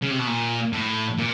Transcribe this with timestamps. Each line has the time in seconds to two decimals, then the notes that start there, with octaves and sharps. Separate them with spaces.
0.02 C#3
0.10 C3
0.19 B2
0.27 A#2
0.73 A2
1.18 A#2